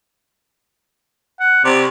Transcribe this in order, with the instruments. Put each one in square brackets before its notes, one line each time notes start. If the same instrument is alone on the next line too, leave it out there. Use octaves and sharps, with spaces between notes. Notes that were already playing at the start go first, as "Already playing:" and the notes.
[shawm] F#5
[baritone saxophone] C3 [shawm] D5